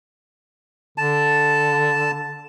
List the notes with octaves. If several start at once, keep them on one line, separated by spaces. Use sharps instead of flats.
D3 A5